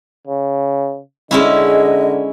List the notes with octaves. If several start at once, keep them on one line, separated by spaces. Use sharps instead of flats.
C#3
D3 G#3 C#4 E4 D#5